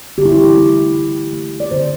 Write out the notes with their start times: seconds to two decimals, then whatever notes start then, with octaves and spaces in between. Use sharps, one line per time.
0.18 D3 G4
0.25 E4
0.32 G4
0.57 A3
0.95 D3
1.33 A3
1.60 D5
1.71 D3 C5